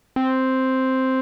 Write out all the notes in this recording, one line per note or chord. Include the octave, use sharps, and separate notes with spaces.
C4